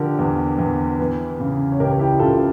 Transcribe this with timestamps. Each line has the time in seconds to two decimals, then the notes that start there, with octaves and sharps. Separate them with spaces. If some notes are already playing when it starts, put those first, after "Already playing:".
Already playing: D3 F3 G4 A#4
0.19 E2
0.59 E2
0.99 E3
1.40 C#3
1.72 C#5
1.80 C#2 G4 A#4
1.99 E4 G4
2.19 C#2 F4 A4